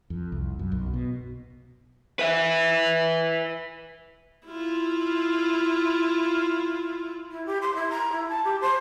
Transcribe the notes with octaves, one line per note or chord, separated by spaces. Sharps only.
F2
C2
F#2
B1
B2
B4 E5
E4 F4
E4
G4
C6
E4
A#5
E4
A5
G4
C5